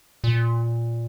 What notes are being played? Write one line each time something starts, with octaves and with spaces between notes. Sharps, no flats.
A#2